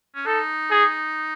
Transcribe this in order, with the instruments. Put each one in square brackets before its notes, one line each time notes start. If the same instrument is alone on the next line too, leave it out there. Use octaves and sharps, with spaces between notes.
[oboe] C#4
[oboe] D#4 [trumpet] A4
[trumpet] G#4